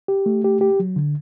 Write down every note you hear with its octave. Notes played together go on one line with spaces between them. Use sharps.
G4
A3
G4
G4
F#3
D3